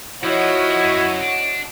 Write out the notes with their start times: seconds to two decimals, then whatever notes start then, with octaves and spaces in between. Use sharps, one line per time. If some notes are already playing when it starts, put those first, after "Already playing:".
0.24 F3 E4 F#4 C#5 D#5
0.83 F#2
1.21 D4